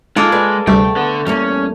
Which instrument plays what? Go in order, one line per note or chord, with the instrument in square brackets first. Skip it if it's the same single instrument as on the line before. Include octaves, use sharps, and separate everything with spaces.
[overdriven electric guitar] G#3 [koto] A#3 A4 A#4 [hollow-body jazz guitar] D#4 [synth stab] F4
[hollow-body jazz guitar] G#4 B4 D5
[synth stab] D2 C3 G3 [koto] A3 [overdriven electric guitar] G5
[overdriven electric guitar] D3 [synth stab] B3
[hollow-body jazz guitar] E2 G3 A#3 [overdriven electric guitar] C#4